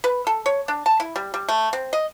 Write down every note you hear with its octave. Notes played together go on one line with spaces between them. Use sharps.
B4
A4
C#5
D4
A5
E4
G3
G3
A3
C4
D#5